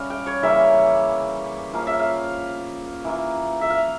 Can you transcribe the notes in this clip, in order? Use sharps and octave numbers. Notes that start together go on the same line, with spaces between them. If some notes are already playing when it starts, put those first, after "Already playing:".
Already playing: G3 C#4 F5
G5
C#5
C#3 E3 G3 A#3 E5
F3 A#3 C#4 F5
E5
F5
E3 A#3 F4
E5
F5